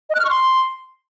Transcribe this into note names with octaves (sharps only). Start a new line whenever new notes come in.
D#5
F#6
F6
C#6
C6